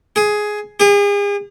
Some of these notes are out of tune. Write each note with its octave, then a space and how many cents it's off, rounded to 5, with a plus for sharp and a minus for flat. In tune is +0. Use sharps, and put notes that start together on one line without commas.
G#4 +10
G#4 -40